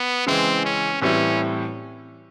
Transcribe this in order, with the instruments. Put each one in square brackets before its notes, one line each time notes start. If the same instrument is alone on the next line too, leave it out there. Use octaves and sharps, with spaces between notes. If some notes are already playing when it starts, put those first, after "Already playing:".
Already playing: [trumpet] B3
[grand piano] C#3 E3 G#3 [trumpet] C4
[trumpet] C#4
[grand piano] A2 E3 G3 C4 E4 [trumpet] C#4